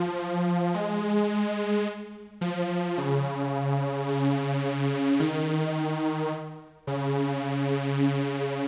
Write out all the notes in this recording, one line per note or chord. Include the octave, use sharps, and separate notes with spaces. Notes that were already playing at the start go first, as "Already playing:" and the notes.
Already playing: F3
F3
G#3
F3
C#3
C#3
D#3
C#3